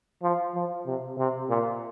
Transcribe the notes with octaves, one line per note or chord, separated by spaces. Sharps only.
F3
F3
C3
C3
A#2